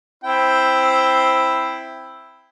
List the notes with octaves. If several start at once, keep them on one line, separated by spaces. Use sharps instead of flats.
C4 E4 G5